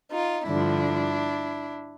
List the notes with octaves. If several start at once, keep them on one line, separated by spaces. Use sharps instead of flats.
D#4 F4
G2 D3 F3 D4 E4